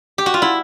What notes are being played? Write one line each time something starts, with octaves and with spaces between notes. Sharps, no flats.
G4
F#4
F4
E4